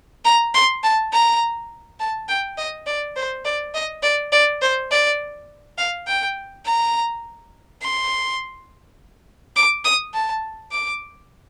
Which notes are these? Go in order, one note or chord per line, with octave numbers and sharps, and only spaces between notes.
A#5
C6
A5
A#5
A5
G5
D#5
D5
C5
D5
D#5
D5
D5
C5
D5
F5
G5
A#5
C6
D6
D#6
A5
D6